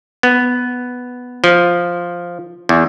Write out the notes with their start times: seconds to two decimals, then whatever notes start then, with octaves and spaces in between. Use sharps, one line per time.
0.23 B3
1.44 F3
2.69 E2